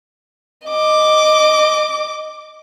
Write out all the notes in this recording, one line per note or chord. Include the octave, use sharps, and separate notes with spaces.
D#5 D6